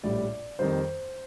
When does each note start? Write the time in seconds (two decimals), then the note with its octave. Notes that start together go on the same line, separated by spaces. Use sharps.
0.04 A#1 A2 G3 D5
0.59 F2 D#3 G3 C5